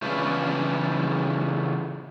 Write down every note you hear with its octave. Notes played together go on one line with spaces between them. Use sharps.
C#3 E3 C#4 D4 F4 B4